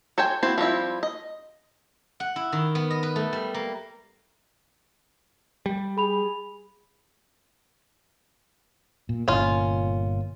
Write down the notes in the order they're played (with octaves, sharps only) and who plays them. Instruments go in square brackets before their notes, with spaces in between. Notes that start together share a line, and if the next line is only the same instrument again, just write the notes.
[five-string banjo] A4 C5 C#5 G5 G#5
A#3 C4 E4 F#4 C5
F3 G3 C4 E4
D#5
[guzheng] F#5
E4
D#3
B3
D#5
B4
A3
G3
A#3
[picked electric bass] G3
[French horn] G#4 [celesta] B5 F7
[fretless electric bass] A#2
[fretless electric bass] G1 A#2 [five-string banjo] C#4 F4